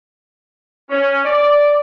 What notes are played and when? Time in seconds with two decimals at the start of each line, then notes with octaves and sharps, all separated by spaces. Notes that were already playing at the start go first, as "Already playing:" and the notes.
0.90 C#4
1.25 D5